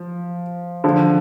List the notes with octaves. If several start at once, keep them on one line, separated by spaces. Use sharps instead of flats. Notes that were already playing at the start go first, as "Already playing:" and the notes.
Already playing: F3
D3 F3